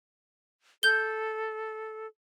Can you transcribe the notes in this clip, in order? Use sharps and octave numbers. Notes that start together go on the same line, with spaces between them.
A4 G6 G7